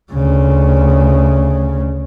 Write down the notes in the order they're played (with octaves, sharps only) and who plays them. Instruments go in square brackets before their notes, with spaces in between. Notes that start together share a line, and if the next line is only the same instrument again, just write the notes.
[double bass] D2 C#3